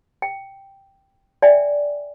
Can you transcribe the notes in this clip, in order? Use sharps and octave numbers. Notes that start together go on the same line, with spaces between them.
G5
D5 E5 G5 G#5